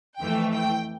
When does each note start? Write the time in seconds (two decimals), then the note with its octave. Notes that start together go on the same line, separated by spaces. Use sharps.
0.20 F2 E3 A3 G5
0.54 G5